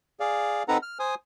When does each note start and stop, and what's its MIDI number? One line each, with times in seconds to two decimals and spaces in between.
0.20 0.63 68
0.20 0.63 74
0.20 0.63 77
0.68 0.78 60
0.68 0.78 63
0.68 0.78 69
0.68 0.78 71
0.68 0.78 78
0.68 0.78 82
0.83 0.98 89
0.99 1.15 72
0.99 1.15 80
0.99 1.15 87